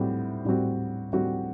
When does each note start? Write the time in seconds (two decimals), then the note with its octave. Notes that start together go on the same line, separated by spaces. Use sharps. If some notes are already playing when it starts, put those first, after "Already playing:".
Already playing: A2 G3 C4 F#4
0.45 A2 G3 C4 F#4
1.13 A2 G3 C4 F#4